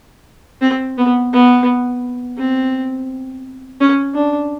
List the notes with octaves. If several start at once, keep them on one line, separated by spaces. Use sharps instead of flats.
C4
B3
B3
C4
C#4
D4